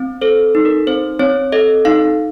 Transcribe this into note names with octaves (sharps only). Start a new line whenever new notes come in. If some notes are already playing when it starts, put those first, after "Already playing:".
Already playing: C4
A4 C5
D#4
A#4
C4 C5
C4 C#5
A4 D#5
D#4 F5